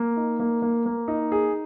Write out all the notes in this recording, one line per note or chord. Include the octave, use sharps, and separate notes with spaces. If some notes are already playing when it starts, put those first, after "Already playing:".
Already playing: A#3
D#4
A#3
A#3
A#3
D#4
G#4